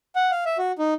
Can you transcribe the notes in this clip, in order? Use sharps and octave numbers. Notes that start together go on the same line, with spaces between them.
F#5
F5
E5
F#4
D#4